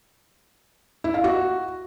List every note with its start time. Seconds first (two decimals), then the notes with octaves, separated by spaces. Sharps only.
1.04 E4
1.14 F5
1.24 F#4